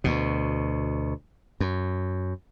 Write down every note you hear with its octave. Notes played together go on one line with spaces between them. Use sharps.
D2 B2
F#2